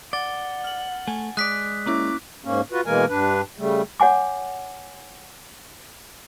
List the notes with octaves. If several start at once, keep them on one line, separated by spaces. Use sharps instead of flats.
D5 F#5 A6 G7
F6 F#7
A3 G#5
G#3 D5 D#6 F#6 B6
A#3 C#4 E4 D6
G#2 A#3 C#4
F4 F#4 B4
B2 E3 G#3 A#3 A#4 G#5
G2 D4 B4
C#3 G3 A3
C#5 F#5 G#5 D6